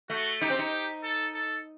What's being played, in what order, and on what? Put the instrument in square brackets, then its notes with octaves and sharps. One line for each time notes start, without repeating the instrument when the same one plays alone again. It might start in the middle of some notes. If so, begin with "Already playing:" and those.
[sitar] A3 [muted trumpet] F#4
[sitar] D#4 [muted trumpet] G4
[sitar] C4
D#4
[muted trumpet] A4
A4